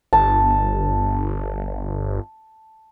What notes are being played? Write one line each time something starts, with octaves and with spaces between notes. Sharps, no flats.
G1 A5